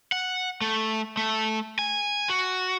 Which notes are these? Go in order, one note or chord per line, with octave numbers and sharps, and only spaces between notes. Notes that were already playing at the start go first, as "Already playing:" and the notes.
F#5
A3
A3
G#5
F#4